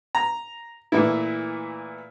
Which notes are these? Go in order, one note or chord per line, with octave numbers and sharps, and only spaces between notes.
A#5
A#2 E3 A3 E4